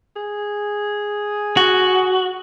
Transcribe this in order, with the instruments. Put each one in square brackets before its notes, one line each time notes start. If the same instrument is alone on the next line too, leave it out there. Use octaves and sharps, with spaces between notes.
[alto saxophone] G#4
[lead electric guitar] F#4